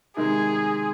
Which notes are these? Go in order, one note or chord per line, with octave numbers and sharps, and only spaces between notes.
C3 D#3 G#3 G#4